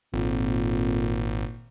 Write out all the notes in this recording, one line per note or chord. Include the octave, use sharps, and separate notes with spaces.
G#1 F2 A#2